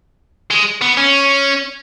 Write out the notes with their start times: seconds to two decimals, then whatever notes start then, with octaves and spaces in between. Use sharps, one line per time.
0.51 G#3
0.81 B3
0.97 C#4